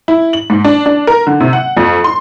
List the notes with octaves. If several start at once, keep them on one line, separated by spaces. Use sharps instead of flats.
E4
F#7
G#2
D4
D4
A#4
D3
C3
F#5
F2
C6